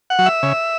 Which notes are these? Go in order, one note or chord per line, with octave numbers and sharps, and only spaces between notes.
F#5
F#3
E5
C#3